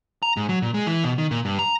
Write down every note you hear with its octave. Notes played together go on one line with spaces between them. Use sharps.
A#5
G#2
F#3
A#2
G#3
E3
B2
D#3
A#2
G2
A#5